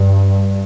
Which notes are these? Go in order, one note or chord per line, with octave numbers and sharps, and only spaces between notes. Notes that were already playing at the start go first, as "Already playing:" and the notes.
Already playing: G2